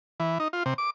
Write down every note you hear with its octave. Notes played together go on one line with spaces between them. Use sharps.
E3
D#4
F4
C3
D6